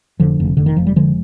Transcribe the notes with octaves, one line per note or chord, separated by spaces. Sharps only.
F1 D3 F3
F1
F1 D3
D#3
F1 F3
G3
D3 F3 G#3